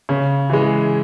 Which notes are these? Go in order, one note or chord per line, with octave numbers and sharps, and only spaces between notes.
C#3
E3 G#3